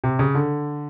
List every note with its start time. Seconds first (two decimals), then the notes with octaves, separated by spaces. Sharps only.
0.04 C3
0.19 C#3
0.35 D3